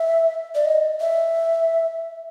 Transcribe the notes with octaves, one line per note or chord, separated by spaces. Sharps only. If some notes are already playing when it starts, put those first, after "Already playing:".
Already playing: E5
D5
D#5
E5